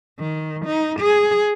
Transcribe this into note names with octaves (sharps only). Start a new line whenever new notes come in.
D#3
D#4
G#4